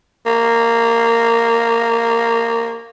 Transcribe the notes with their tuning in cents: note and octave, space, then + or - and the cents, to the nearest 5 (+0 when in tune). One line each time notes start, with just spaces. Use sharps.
A#3 -10